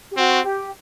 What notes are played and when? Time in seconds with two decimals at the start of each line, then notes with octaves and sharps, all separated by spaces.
0.11 G4
0.17 C4 F#4
0.43 G4